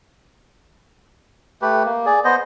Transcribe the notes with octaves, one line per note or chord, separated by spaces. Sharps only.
A3 G4 B4
A#3
G#4 D5
B3 C5 D#5